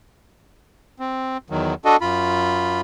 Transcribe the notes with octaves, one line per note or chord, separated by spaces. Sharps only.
C4
E2 D#3 F#3
D4 F#4 A4 D#5
F#2 F4 B5